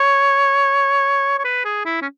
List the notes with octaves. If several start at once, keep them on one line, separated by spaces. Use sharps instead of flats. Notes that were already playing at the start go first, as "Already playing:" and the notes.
Already playing: C#5
C#5
B4
G#4
E4
C#4